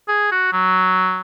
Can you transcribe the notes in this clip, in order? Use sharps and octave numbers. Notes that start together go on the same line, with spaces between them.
G#4
F#4
F#3